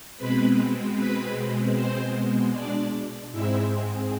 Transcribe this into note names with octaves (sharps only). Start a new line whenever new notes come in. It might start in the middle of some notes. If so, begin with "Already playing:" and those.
B2 G#3 C4 B4 B5
B4 B5
C4 C5
D4 D5
G#2 G#3 C4 E4 E5